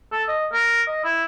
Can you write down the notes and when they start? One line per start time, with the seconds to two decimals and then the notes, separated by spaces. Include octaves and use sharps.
0.12 A4
0.28 D#5
0.53 A#4
0.87 D#5
1.04 E4